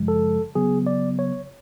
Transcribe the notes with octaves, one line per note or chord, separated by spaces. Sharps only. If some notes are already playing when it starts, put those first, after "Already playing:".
Already playing: F#2 C#3 F3 G#3
A4
C#3 F#3 B3 G#4
D5
C#5